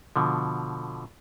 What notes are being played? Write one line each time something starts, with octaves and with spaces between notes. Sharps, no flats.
B2 D3 F3